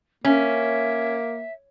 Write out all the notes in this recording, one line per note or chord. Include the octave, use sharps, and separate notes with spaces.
A#3 C#4 E5